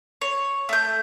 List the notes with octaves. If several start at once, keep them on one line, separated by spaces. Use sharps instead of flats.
C#5
A3 G6